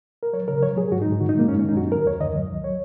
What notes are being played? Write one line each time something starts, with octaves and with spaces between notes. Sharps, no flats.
A#4
F#3 C#5
C#3 A#4
F#3 C#5
F#3 G#4
G#2 F#4
D#4
G#2
D#3 F#4
D#4
G#3
A#3
F#2 C#4
C#4
D#3
D#4
F#3 F#4
F#2 A#4
D#2 C#5
D#3 D#5
F#3
C#2
F#3 C#5